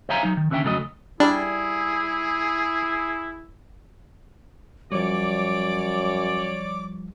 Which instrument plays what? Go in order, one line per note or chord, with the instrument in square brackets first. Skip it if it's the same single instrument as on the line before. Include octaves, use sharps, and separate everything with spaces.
[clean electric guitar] C5 C#5 E5 F5 G#5 A#5
F#3 D#4
D#3
D#2 D3 C#4 D5 E5 G5
F2 C#3 F#3 A3 G4 D#5
[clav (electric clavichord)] G3 [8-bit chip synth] D4 [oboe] E4 [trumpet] G#4
[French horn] F#2 [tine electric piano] F3 G3 [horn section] C#5 D5 [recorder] D6